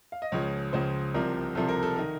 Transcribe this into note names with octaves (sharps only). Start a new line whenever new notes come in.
F5
D#5
C#2 C#3 F3 C#5
C#2 C#3 F3 C5
C2 C3 F3 A#4
C2 C3 F3 A4
A#4
A4
D#3 A#4